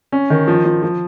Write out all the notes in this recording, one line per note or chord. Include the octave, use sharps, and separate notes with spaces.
C#4
D#3
F3
F3
F3